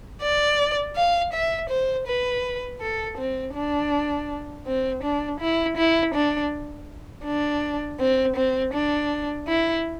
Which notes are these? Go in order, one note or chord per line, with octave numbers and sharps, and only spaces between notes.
D5
F5
E5
C5
B4
A4
C4
D4
C4
D4
E4
E4
D4
D4
C4
C4
D4
E4